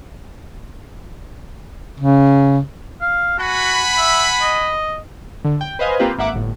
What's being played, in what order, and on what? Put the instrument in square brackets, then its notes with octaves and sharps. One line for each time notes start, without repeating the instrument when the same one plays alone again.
[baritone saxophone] C#3
[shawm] F5
[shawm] F#4 [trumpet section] F#5 G#5 B5
[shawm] E5
D#5
[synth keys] D3
G5
B4 C5 D#5 F5 G#5
A#3 C4 F4 G4 B4
G#1 A#3 E5 F#5 D6
G1 A2